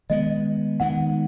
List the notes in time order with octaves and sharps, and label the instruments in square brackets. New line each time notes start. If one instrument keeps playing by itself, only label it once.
[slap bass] D#3 G#3 B3 [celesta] D#5
[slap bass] D#3 G#3 B3 [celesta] F#5